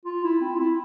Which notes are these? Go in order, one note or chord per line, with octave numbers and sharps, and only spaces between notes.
F4
E4
C4
F4
E4